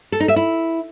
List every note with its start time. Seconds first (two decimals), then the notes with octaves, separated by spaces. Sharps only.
0.12 A4
0.20 D#4
0.28 E5
0.36 E4